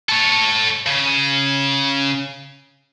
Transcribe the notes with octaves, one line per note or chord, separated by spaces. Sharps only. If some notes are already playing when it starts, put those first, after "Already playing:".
A4 C#5
C#3